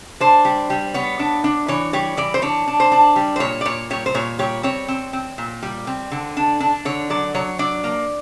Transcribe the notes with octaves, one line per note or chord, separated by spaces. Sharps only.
D4 C5
G3
G3
B3 C#5
D4
D4
E3 C#5
G3 C#5
E3 D5
C5
D4 C#5
D4
C5
D4
G3
C5
A#2 C#5
D5
A#2 C#5
G3 C#5
C5
A#2 C#5
G3 C#5
C4 C#5
C4
C4
A#2
G3
C4
D3
D4
D4
D3 C#5
F#3 D5
F#3 C#5
D4 D5
A#3